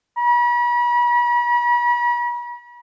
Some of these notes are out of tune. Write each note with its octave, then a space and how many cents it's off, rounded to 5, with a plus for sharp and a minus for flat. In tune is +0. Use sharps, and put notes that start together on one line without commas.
B5 -40